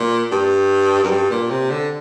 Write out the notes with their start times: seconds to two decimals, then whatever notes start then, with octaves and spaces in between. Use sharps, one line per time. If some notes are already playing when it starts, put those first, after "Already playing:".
Already playing: A#2
0.32 G2
1.03 F#2
1.11 G2
1.31 A#2
1.51 C3
1.70 D3